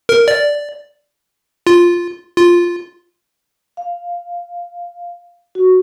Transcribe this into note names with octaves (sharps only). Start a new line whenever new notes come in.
A#4
D5
F4
F4
F5
F#4